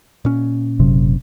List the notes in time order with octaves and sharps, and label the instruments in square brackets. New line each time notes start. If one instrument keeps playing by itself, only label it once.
[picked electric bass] A#2 C#4
[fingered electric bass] F#1 C3 F#3